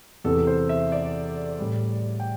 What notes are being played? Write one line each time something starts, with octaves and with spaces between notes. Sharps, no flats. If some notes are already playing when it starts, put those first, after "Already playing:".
E2 C3 E3 A4
C5
E5
D5
A2 G3
G5